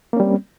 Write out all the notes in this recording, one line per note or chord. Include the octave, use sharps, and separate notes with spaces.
G3 A#3 C4 C#4